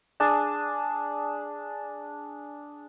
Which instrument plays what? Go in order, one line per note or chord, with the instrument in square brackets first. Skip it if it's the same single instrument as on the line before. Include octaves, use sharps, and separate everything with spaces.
[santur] D4 G#4 A5